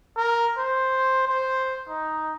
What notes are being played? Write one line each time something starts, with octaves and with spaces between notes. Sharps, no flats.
A#4
C5
C5
D#4